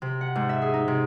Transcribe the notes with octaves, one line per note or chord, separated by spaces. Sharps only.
C3
F#5
G#2
E5
G#4
D#4
C3